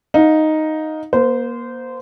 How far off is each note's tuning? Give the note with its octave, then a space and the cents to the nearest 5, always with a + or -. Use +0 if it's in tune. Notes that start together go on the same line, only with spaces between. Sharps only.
D#4 +0 F5 +30
A#3 +30 C5 -20